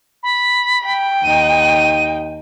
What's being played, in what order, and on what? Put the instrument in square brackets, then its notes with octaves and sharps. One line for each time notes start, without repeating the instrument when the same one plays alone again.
[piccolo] B5
[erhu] G5
[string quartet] D#2 D#4 [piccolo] D#7